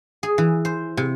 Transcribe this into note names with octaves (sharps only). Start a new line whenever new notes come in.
G#4
E3
C5
C3